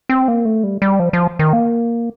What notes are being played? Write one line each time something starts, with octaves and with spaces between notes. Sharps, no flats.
C4
A#3
A3
G3
G3
F3
F3
D#3
A#3